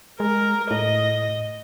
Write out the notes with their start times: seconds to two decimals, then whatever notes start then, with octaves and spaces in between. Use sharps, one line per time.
0.20 G#3 A#4
0.71 A2 D#5